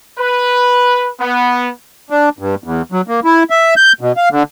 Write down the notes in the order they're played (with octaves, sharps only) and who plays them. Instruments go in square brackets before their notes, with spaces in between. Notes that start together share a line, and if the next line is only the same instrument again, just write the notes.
[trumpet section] B4
B3
[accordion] D4
G2
E2
F#3
A#3
E4
E5
G6
B2
F5
D3